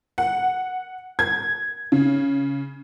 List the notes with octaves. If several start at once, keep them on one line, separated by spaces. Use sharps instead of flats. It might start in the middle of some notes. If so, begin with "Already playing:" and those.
F#5
G#6
C#3